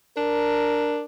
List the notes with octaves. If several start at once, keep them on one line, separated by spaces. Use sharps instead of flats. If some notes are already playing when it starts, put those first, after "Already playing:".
D4 A#4